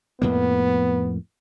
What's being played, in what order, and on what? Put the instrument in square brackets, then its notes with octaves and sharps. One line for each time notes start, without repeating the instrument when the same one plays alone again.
[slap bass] F2 A2 A#3 [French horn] B3